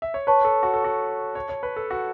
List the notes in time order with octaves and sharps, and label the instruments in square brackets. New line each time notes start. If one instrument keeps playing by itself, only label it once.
[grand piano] E5
C#5
[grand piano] B4 [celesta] C#5 A5 C#6
[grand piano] A4
F#4
A4
F#4
C#5
C#5
B4
A4
F#4